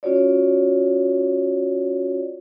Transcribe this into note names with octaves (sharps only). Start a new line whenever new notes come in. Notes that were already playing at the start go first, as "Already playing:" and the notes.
C#4 F4 F#4 C#5 D5